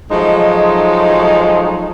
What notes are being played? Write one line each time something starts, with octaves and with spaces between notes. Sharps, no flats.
F3 F#3 G#3 A3 D#4